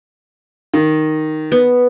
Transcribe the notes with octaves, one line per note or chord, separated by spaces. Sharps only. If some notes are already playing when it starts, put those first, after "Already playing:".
D#3
B3